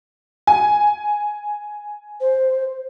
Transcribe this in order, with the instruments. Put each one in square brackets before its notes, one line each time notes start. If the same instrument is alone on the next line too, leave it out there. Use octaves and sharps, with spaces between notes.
[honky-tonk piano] G#5
[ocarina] C5